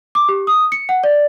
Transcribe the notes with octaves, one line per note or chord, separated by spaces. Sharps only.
D6
G4
D#6
C#7
F#5
D5